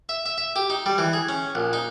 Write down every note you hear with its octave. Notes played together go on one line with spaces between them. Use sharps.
E5
E5
E5
G4
D#4
G3
E3
G#4
C#4
A#1
D#4